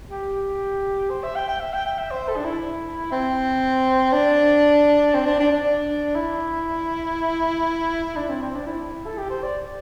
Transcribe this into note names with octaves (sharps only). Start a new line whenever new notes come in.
G4
C5
E5
G5
G5
E5
G5
G5
E5
C5
A4
D4
E4
C4
D4
C4
D4
D4
D4
E4
D4
C4
C4
D4
E4
A4
G4
C5
D5